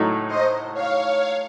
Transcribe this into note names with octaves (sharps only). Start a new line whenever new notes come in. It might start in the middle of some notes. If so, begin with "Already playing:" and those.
Already playing: A2 F#3 A3 D#4
C5 D#5
C#5 F5